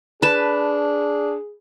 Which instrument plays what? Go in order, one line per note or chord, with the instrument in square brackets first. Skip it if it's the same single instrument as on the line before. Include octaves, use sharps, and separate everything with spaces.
[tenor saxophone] D4 [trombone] G#4 [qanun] B4 A5